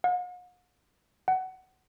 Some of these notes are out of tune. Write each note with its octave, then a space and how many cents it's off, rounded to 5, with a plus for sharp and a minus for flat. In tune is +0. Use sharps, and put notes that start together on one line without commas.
F#5 -45
F#5 +20